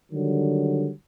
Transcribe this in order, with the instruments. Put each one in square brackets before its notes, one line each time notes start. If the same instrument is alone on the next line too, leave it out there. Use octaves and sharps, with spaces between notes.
[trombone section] D3 D#3 F#3 G3